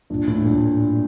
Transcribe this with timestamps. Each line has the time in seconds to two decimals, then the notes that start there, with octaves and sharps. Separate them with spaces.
0.10 G2 A#2
0.28 A2
0.46 G2 A#2